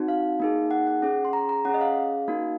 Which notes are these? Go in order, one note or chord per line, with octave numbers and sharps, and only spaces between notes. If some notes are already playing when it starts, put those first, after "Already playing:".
Already playing: C4 D#4 F#4
F5
A#3 D#4 G#4
F#5
F#5
C#4 G#4
C6
A#5
A#5
C#4 G#4 F#5
D#5
F5
A#3 D#4 F#4 F5